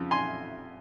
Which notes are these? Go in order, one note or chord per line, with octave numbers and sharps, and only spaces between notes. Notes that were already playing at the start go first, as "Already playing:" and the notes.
Already playing: F2 C#3 F3
G#5 C6